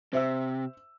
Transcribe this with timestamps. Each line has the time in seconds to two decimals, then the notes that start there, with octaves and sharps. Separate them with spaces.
0.13 C3 C5 E5 E6